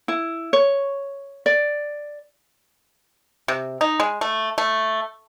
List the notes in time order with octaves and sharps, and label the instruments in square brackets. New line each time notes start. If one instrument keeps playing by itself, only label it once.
[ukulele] E4
C#5
D5
[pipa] C3
D#4
G#3
A3
A3